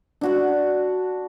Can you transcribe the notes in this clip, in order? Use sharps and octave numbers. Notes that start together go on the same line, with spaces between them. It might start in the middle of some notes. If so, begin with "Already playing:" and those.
D4 F#4 F#5